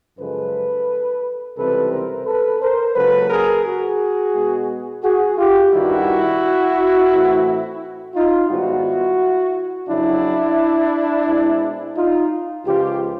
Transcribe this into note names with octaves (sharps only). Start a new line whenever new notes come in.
F#2 C#3 F3 G#3 A4 B4
C#2 C3 E3 G3 C4 A4 B4
A#4 C5
A4 B4
A#4 C5
C#2 C#3 F#3 A#3 A4 B4
G#4 A#4
F#4 G#4
B2 G#3 B3
F#4 G#4
F4 G4
G2 D#3 G3 E4 F#4
A2 E3 A3 C4
D#4 F4
G#2 D#3 G3 B3 E4 F#4
F2 C#3 F#3 D4 E4
B2 G#3 C4
D#4 F4
C#2 C#3 F3 F4 G4